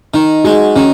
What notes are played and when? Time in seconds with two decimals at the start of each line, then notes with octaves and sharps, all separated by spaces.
0.14 D#3 D#4
0.44 G#3 F#4
0.76 D#3 C#4